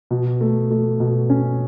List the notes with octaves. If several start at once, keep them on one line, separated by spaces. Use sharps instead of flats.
B2
A3
A3
B2
C#4